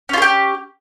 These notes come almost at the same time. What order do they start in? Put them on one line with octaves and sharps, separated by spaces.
C#4 F4 G#4 G4